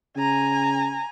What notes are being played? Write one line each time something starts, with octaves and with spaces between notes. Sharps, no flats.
C#3 G#5 A#5